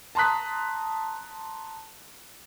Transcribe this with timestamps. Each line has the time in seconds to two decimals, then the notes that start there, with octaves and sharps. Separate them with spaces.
0.15 A5 A#5 C6 D#6 F#6 B6